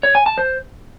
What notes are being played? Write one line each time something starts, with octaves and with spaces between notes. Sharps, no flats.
C#5
G#5
A5
C5